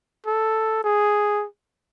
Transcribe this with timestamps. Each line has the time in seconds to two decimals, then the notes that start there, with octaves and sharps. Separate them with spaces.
0.27 A4
0.84 G#4